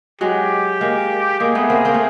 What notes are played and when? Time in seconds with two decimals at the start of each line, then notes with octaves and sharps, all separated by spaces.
0.21 F#3 G#3 G4
0.81 G#3 A#3
1.40 G#3 A#3 G#4
1.55 A3 B3
1.70 A#3 C4
1.85 A#3 C4
1.94 A3